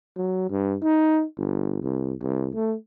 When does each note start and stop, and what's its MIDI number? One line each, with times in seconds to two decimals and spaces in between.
0.17 0.45 54
0.50 0.76 43
0.83 1.24 63
1.38 1.81 31
1.82 2.13 36
2.22 2.49 36
2.55 2.75 57